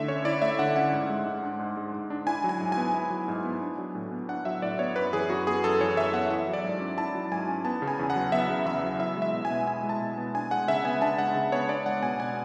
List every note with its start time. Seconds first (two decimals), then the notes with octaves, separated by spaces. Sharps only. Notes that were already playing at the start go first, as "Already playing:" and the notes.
Already playing: D3 A3 E4 E5
0.08 C#4 C#5
0.25 E4 D5
0.42 A3 E5
0.59 D3 F#5
0.75 C#4 F#5
0.92 G#2
1.10 G#3
1.26 G#2
1.43 D4
1.59 G#2
1.77 G#3
1.94 G#2
2.10 D4
2.27 E4 G#5
2.44 F#3
2.49 G#5
2.61 G#2
2.72 B3 G#5
2.94 E4
3.10 F#3
3.28 G#2
3.44 B3
3.62 D4
3.78 F#3
3.95 A2
4.12 B3
4.29 D4 F#5
4.45 F#3 E5
4.62 A2 D5
4.79 B3 C#5
4.96 F#2 B4
5.13 E3 G#4
5.30 F#2 F#4
5.47 B3 G#4
5.64 F#2 A4
5.81 E3 C#5
5.97 F#2 E5
6.13 B3 F#5
6.30 E4 E5
6.47 F#3
6.53 D5
6.64 G#2
6.81 C#4
6.98 E4 A5
7.14 F#3
7.32 G#2 G#5
7.48 C#4
7.65 B3 A5
7.82 C#3
7.88 G#5
7.99 E2
8.10 F#5
8.16 F#3
8.32 B3 E5
8.50 C#3
8.66 E2 E5
8.83 F#3
8.99 E4 E5
9.16 G#3
9.22 E5
9.33 B2
9.45 G#5
9.50 B3
9.67 E4 G#5
9.83 G#3
9.89 A5
10.01 B2
10.18 B3
10.34 D4 G#5
10.51 G#3 F#5
10.68 C#3 E5
10.85 B3 G#5
11.02 D4 A5
11.18 G#3 F#5
11.35 C#3
11.52 B3 C#5
11.69 D4 D5
11.86 G#3 F#5
12.03 B2 G#5
12.20 B3 G#5